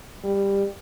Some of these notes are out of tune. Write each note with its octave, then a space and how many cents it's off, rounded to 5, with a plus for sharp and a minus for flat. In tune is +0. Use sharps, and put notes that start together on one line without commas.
G3 +15